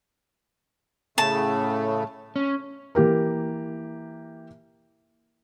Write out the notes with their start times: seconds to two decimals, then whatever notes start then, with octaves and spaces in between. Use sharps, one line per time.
1.18 A2 C#3 A3 A5
2.36 C#4
2.95 E3 A#3 G4 A#4